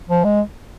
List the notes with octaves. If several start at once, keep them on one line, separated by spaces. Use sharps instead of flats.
F3
G#3